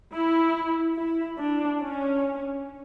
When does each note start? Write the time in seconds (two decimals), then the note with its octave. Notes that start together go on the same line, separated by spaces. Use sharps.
0.12 E4
0.97 E4
1.39 D4
1.80 C#4